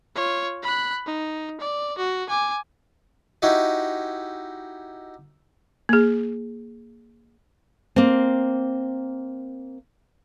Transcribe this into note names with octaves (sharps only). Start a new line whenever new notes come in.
F4 C#5
B5 F#6
D#4
D5
F#4
G#5 D6
D#4 E4 F#4 G4 D#5
A#3 G#4
A#3 C4